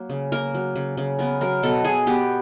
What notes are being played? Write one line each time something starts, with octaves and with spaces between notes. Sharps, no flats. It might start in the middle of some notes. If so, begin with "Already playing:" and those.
Already playing: F#3 A#3
C#3
A#3 A#4
F#3
C#3
C#3
B3 A#4
F#3 A#4
B2 A4
B2 G#4
B3 G4